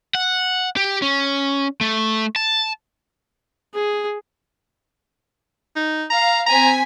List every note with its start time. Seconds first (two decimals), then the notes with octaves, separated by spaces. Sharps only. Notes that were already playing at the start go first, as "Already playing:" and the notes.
0.15 F#5
0.76 G4
1.02 C#4
1.81 A3
2.36 A5
3.74 G#4
5.76 D#4
6.10 F5 A#5
6.46 C4 G#5 A#5 B6